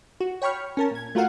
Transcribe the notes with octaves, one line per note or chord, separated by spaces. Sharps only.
F#4
C#5 G5 B5 C#6 F6
C#4 A#4 A5
A#2 G#6
A3 F4 F#4 A#4 F5 F#5